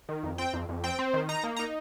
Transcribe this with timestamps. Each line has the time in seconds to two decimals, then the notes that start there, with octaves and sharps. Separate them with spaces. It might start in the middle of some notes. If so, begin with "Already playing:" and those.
0.09 D#3
0.23 F2
0.38 C4 G5
0.53 F2
0.69 F2
0.84 C4 G5
0.99 C4
1.14 D#3
1.29 D#4 A#5
1.44 A#3
1.57 A#5
1.59 D#4